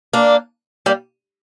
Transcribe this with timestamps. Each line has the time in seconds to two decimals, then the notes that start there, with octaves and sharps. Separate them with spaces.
0.13 A#3 D4
0.86 G3 A#3